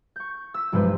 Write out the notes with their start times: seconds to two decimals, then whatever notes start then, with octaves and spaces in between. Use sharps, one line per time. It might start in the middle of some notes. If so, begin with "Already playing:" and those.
0.16 C#6 G6
0.54 E6 B6
0.72 B1 G2 F3 G#3 B4 C5